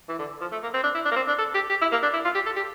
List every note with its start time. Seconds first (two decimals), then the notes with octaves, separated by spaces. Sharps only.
0.09 E3
0.19 D3
0.41 F3
0.52 A3
0.63 A#3
0.74 C4
0.84 D4
0.95 E4
1.05 D4
1.11 A#3
1.16 C4
1.28 D4
1.38 A4
1.54 G4
1.70 G4
1.81 E4
1.92 A#3
2.03 D4
2.13 E4
2.25 F4
2.35 G4
2.46 A4
2.56 G4